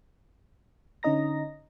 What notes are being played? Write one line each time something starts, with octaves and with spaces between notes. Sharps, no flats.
D3 C#4 D#4 D#5 A#5 A#6